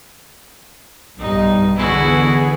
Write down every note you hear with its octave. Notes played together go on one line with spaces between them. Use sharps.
B1 G2 G3 D#4
E2 D3 B3 E4 F#4 G#4